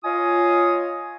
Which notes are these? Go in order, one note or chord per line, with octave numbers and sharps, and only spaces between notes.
F4 C#5 D#5 F5 G#5 D#6